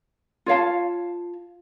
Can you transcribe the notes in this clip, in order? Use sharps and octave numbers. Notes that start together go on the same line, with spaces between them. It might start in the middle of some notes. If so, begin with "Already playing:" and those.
F4 C#5 F5 A5